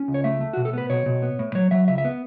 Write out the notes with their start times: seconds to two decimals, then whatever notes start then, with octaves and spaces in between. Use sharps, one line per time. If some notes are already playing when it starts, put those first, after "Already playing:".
Already playing: C#4
0.08 C#2
0.14 C#5
0.24 A3 E5
0.41 A3
0.53 B2 F#4
0.65 A4
0.73 B3 B4
0.90 B2 C#5
1.06 B2
1.23 B3
1.39 A2
1.55 F#3 C#5
1.71 F#3 E5
1.88 C#2 E5
1.98 E5
2.05 B3